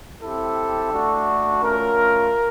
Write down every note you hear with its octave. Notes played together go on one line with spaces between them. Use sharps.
C4 E4 G4 A4
A3 D4 F#4
A3 C#4 F4 A#4